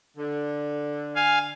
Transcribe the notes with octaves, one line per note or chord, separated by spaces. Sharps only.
D3
F5 G#5